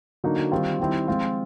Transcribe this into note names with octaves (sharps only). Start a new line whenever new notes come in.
D3 F#3 A#3 D#4 F#4
D#3 G3 C4 F4
D#3 G3 C4 E4
F3 G#3 C4 F4